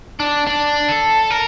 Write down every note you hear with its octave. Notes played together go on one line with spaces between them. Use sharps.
D4
D4
A4
A#4